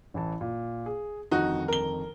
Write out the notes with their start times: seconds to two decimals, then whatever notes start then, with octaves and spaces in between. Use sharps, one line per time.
0.14 A1 E3 A5
0.41 A#2
0.86 G#4
1.31 G1 F2 D#3 D#4 F#4
1.68 A#4 G7